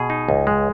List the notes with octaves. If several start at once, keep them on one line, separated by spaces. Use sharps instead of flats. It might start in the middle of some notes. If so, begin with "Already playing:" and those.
Already playing: B2 G#4
D#4
C#2
G#3